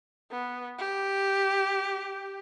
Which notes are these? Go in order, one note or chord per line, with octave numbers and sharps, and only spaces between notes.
B3
G4